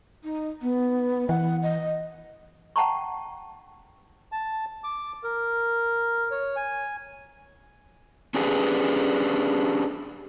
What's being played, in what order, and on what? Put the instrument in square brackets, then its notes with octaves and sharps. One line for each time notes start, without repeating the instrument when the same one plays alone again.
[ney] D#4
B3
[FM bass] E3 [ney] F#5
[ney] D#5
[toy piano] F#5 G5 A5 A#5 C#6
[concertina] A5
D6
A#4
C#5
G#5
[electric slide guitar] C#4 D4 G4 G#4 B4